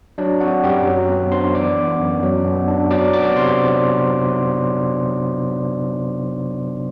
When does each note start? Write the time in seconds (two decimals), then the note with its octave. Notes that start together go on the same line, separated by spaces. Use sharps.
0.18 F#3 D4 D5
0.40 C4 F#4 F#5
0.63 F#2 G4 G5
0.86 F#3
1.09 B3
1.32 D4 C5 C6
1.55 E3 D5 D6
1.77 B3
2.00 F#2
2.23 F#3
2.45 B3
2.68 D4
2.91 F#3 D5 D6
3.13 B3 D5 D6
3.36 C3 C5 C6